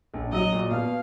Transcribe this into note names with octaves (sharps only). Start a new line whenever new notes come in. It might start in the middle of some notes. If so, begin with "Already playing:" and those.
A#1
F#3 D#5
A#2
B2 F5